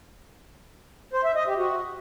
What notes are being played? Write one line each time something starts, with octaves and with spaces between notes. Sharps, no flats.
C5
E5
D#5
G4
F#4